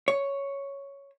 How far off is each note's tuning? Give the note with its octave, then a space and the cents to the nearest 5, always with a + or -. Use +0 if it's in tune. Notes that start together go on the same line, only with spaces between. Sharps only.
C#5 +5